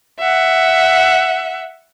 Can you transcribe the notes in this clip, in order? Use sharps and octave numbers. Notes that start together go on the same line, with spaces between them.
E5 F#5